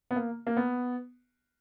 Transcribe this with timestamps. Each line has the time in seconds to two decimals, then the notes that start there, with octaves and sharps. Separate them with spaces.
0.11 B3
0.16 A#3
0.47 A#3
0.57 B3